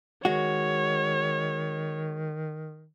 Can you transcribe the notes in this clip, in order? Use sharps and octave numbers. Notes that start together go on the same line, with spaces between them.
D#3 G#3 F#4 C#5